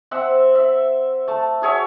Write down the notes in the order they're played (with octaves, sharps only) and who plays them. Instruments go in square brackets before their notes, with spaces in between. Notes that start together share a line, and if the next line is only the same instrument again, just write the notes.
[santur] C4 E5 F#5 E6
E5
A3 A5
F#4 G#4 C#5 E5